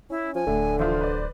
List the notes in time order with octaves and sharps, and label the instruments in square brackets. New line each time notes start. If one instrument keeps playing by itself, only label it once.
[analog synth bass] C#4 [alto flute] E4
[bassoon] F3 [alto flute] G#5
[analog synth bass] D1 [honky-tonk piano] A2 A3 [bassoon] D3
[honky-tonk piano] E3 F3 F4 [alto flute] C5
[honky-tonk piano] B4 D5